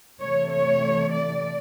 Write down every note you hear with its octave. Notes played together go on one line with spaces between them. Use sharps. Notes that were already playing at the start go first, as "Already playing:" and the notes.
C3 E3 A3 C#5
C#5
D5